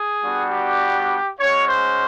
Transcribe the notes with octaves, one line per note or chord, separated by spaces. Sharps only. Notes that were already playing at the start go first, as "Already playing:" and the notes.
Already playing: G#4
G3 B3 D4 F#4
G4
G#3 C#4 F#4 C#5
C5